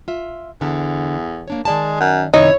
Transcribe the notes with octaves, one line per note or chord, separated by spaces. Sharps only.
F4 E5
E2 D3
A#3 D4 C#5
D#3 G#3 D5 A5
F#2
F#2 C3 D#3 D#4 E4 C#5